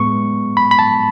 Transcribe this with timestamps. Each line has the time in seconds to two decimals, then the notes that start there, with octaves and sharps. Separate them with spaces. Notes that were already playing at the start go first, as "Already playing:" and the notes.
Already playing: A2 G#3 B3 C#6
0.57 B5
0.71 B5
0.79 A5